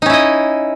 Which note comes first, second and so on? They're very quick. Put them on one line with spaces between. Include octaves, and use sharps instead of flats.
D#4 C#4 E4 D#5